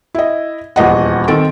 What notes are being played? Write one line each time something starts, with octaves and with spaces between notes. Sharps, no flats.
E4 D#5
D#1 E2 D#5 F#5
D#3 C4 A4 D7